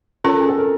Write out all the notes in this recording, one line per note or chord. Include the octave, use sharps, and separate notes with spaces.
C#4 F4 A4 A#4 C#5
G#4
A4
A#4